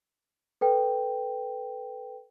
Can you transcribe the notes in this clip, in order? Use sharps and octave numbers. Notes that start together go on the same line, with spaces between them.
A4 B4 G5